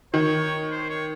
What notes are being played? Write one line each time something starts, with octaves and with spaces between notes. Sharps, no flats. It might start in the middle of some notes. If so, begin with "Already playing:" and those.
D#3 C#5
C5
C#5